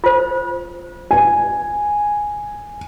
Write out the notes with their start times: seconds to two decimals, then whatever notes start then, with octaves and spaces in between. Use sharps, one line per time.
0.04 F4 C5
1.11 G#5